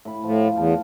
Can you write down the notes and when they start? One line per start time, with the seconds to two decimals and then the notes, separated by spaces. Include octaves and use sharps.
0.05 A2 B5
0.24 A2 F3
0.55 E2 F5 G5 A5